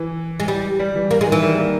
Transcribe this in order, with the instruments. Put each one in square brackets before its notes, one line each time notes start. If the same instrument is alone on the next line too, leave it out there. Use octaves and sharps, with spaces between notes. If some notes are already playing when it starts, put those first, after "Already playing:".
Already playing: [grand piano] E3
[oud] G#3
G3
[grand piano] G3
E3
[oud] A#3
G#3
[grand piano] D#3
[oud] E3
[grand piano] G3
A#3